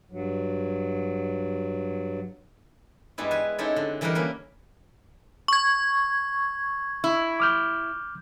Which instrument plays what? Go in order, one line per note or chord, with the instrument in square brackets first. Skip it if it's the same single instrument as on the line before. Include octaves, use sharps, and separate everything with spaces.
[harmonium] G2 F#3
[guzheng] G2 G3 G#3 B3 E4
B4 G#5
C4 C#4 D#4 E4 G4 A4
D3
D3 E3 G3 E4 F#4 A#4
A#3 C#4 B4
[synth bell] C#6 G#6
[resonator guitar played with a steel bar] E4
[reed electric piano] D6 F6 G6